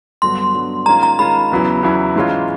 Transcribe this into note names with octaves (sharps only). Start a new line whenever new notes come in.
G2 D3 F#3 B3 C6
G2 D3 F#3 B3
D#3 G#3 C#4 F4 A#5
A#5
D#3 G#3 C#4 F4 B5
E2 C#3 F#3 B3 E4
E2 C#3 F#3 B3 E4
G#2 E3 G#3 C#4 F4